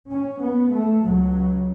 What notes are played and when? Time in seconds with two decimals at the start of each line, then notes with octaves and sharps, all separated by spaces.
0.10 C#4
0.41 B3
0.73 A3
1.04 C#2 C#3 F#3